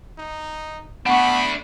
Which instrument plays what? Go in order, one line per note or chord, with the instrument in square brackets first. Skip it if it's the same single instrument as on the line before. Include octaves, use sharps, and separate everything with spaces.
[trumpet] D#4
[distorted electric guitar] A3 D4 [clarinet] B3 [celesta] F#5 C#6 [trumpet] B5